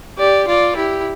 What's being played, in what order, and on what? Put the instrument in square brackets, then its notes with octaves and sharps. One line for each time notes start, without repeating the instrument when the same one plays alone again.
[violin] G4 [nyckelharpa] D5
[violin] F4 [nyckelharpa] D5
[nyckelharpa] E4 [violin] G4